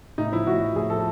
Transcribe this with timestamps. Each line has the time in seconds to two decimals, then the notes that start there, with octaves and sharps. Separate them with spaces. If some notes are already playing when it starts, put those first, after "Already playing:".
0.18 A2 D#4
0.32 F3 E4
0.47 A2 F#4
0.61 F3
0.76 A2 G#4
0.90 F3 A4